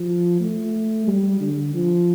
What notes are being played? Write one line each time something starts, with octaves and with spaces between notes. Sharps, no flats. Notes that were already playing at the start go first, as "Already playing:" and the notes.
Already playing: F3
A3
G3
D3
F3